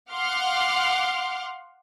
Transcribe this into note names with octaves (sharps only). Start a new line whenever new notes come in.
F5 F#5 C6 D6 F6